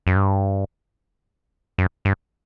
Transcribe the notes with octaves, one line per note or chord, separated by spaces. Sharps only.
F#2
G2
F#2
G2